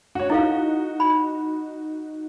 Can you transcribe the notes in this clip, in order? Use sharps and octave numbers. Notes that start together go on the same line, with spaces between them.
F#4 C#5
D#4 E4 F#4 A4 F5
B5